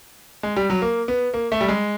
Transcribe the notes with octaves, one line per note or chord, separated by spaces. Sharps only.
G#3
G3
F#3
A#3
B3
A#3
A3
G3
G#3